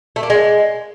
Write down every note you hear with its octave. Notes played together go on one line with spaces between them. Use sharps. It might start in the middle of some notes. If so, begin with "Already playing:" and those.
A3
A#3
G#3